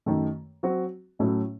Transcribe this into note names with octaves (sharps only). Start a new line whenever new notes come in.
F#2 D#3 A3
F#3 C4 F#4
A2 F#3 A3 C#4 E4